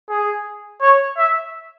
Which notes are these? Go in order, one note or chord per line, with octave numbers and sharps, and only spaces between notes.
G#4
C#5
E5